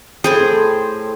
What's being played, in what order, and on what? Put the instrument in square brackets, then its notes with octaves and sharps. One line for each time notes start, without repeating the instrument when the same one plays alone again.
[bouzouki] A2 C5 G5 [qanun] G#4